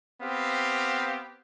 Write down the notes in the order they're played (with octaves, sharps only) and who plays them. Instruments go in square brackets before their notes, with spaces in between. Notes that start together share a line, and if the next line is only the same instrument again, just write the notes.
[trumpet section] B3 C4 G4 F5